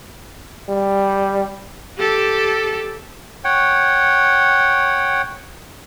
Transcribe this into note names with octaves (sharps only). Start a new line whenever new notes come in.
G3
G4 A4
C#5 F#5 G5